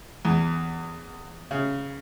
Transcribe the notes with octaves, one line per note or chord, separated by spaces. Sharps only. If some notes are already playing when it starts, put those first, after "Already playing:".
E2
C#3